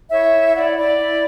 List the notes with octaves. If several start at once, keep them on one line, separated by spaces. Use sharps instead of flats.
E4 C#5 E5
E4
E4 D5 F#5
E4 D5
E4